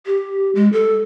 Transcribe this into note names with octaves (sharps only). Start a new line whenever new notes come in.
G4
G#3
A4